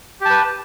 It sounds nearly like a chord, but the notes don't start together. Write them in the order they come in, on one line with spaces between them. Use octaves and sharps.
G4 A5 B4